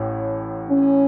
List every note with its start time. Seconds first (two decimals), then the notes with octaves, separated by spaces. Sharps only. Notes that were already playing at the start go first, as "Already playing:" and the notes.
Already playing: A1 A2
0.69 C#4